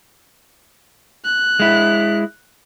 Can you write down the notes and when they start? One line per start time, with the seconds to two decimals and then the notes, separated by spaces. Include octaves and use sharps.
1.25 F#6
1.60 G#3 E4